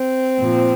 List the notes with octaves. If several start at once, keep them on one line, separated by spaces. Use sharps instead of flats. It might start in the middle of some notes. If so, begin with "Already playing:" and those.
Already playing: C4
A#2 F3